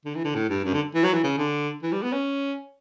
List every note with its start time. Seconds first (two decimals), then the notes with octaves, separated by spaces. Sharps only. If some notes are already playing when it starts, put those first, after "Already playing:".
0.05 D3
0.15 E3
0.24 D3
0.35 A2
0.49 G2
0.64 F#2
0.74 D3
0.94 E3
1.04 F#3
1.13 E3
1.23 C#3
1.38 D3
1.82 E3
1.92 G3
2.02 B3
2.12 C#4